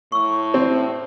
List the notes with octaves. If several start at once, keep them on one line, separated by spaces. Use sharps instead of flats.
A2 C#6 E6
C4